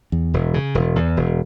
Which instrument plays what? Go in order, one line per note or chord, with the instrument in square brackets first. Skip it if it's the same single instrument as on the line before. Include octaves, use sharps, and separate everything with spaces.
[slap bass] E2
E1
C#3
E1
E2
E1